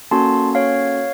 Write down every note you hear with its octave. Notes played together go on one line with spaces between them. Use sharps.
A#3 C#4 F#4 A4 A5 C6
C#5 F5